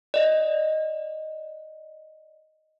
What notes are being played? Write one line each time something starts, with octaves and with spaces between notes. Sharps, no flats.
D5 D#5